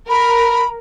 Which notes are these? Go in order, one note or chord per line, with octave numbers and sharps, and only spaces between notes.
A#4 B5